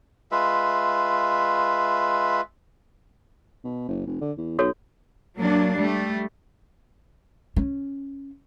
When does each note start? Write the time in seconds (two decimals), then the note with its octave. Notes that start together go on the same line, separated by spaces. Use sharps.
0.32 G#3 F4 B4 E5
3.64 B2
3.88 F#1
4.07 F1
4.21 D3
4.37 E2
4.59 B1 F#4 A4 C#5
5.38 F#3 A#3 D4
5.76 G3 A3
7.57 C#4